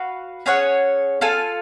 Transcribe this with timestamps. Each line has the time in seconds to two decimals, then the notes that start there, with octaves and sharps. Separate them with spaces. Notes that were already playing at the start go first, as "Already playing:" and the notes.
Already playing: F#4 B4 F5
0.46 C#4 G#4 C#5 F#5
1.21 F4 A4 F5 G#5